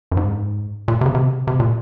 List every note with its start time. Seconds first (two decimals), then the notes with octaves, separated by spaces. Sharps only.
0.12 F#2
0.17 G#2
0.88 A#2
1.01 C3
1.06 C#3
1.15 C3
1.47 C3
1.60 A#2